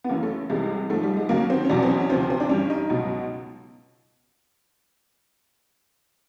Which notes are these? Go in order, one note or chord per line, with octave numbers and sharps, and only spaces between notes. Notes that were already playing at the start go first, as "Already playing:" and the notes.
B3
F#2 C#3 E3 A#3
A3
C2 C3 E3 G3 G#3
G#2 F3 A3
G3
G#3
D#2 C#3 F#3 A#3
C4
C#4
E2 B2 F#3 D4
C4
C#4
C#4
D2 C3 F3 C4
C4
D4
G2 E3 G3 C#4
D#4
C#2 B2 F#3